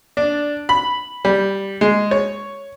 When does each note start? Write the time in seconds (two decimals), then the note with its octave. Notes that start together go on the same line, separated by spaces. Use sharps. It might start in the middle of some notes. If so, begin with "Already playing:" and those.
0.17 D4
0.69 B5
1.25 G3
1.81 G#3
2.11 C#5